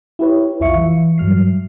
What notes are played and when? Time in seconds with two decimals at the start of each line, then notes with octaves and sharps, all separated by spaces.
0.19 E4 G4 B4 C#5
0.60 B1 F2 F4 E5 C#6 C#7
0.75 E3
1.18 G2 F#3 F6 C7